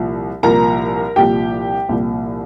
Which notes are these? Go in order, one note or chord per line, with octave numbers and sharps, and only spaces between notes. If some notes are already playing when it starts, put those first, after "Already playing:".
Already playing: C2 A#2 F3
C2 A#2 F3 A#4 A#5
C2 A#2 F3 G4 G5
C2 A#2 F3